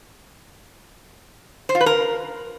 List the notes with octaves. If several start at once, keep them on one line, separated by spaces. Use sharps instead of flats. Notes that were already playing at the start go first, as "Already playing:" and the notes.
C5
F4
B4
A#4